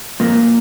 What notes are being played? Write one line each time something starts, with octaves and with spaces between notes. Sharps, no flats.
F2 A#2 A#3